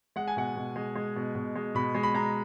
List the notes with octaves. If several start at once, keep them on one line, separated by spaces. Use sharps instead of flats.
G#3 F#5
G#5
B2 F#5
B2
G#3
G#3
B2
B2
G#3
B2 B5
G#3
B5
G#3 A#5